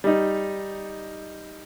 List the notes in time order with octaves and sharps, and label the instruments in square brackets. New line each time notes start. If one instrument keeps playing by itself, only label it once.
[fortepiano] G3 D#4